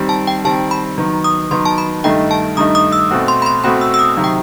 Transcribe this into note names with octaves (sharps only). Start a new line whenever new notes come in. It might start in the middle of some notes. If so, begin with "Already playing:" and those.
Already playing: D#3 G3 C4
A5
G5
D#3 G3 C4 A5
B5
D#3 F#3 B3
D#6
D#3 F#3 B3 C6
A5
B5
G2 D#3 A3 D#4 G5
A5
G2 D#3 A3 D#4 D#6
D#6
E6
B2 A3 C4 F#4
C6
B5
C6
B2 A3 C4 F#4 B5
E6
E6
D#6
C3 D#3 F#3
G5